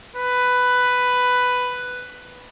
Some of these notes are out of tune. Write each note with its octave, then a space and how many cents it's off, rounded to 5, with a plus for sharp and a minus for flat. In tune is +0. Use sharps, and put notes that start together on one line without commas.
B4 +10